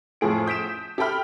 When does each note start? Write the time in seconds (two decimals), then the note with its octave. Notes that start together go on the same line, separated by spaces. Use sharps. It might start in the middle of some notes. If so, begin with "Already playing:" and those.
0.21 F2 A2 G#4 D7
0.46 D#6 G6 B6 D7 E7
0.98 G4 A4 E5 G5 B5 F6